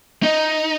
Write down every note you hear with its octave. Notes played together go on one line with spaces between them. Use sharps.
D#4